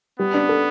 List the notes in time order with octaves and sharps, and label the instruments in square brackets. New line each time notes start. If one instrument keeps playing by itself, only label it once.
[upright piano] G3 [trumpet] B3
[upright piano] D4
A4